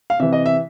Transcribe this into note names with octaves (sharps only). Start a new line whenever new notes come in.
F5
C3 E3 E5
D#5
E5